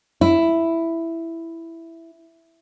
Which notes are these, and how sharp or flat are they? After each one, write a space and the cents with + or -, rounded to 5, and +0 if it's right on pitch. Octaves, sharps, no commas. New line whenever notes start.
E4 +5